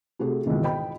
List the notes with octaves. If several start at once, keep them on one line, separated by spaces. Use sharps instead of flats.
C3 A3 F#4 G#4
C#2 G#2 B2 D#3 E3
C5 D#5 G5 B5